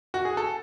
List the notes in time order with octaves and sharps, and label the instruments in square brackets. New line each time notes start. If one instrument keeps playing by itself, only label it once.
[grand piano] F#4
G#4
A4